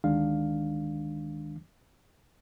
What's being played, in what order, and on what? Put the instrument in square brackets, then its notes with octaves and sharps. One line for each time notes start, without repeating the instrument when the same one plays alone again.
[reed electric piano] D2 D#3 G#3 D4 F5